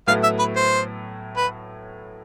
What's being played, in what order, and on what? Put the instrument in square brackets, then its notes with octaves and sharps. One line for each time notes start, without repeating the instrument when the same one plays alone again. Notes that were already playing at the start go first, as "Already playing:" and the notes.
[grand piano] A2 F#3 B3 E4 A4 [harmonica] F5
[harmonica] E5
B4
C5
B4